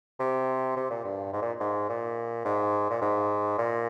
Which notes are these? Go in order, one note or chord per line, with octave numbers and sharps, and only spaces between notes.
C3
C3
A#2
G2
G#2
A#2
G#2
A#2
G#2
A#2
G#2
A#2